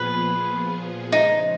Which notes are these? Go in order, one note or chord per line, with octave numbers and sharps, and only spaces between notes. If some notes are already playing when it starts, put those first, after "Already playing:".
Already playing: A#2 F3 B3 F4 G#4 B4
C#3 F3 G#3 D#4